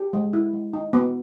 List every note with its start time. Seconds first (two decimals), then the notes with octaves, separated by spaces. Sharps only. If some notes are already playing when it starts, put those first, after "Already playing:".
Already playing: G4
0.13 G#3
0.33 E4
0.53 G#3
0.73 D#4
0.93 B3